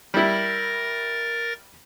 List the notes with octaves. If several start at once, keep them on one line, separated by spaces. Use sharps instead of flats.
G3 E4 A#4 A6 A#6